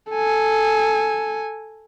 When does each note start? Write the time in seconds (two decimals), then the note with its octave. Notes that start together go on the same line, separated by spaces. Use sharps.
0.10 A4 G#5